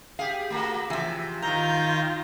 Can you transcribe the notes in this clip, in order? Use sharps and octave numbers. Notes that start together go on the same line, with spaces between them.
G4 G#4 F5
A3 A#3 F#4
C3 E3 F3
D#3 F4 A#5 G6 A#6